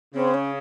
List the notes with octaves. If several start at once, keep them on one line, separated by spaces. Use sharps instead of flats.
C#3 C4
C#4